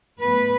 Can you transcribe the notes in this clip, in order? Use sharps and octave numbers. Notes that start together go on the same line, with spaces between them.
A2 F#3 B3 B4